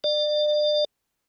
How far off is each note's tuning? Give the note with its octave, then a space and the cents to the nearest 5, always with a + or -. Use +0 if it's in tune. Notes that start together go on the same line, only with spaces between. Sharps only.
D5 +35